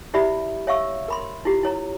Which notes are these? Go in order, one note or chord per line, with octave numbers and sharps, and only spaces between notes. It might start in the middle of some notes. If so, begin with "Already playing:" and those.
E4 G4 D5 E5 B5
C#5 E5 F5 C#6 E6
A#4 B5 C6
E4 F4 G4
E4 C#5 A#5